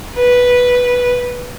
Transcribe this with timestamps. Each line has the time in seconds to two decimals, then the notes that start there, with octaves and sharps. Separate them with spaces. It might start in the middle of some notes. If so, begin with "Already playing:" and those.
0.16 B4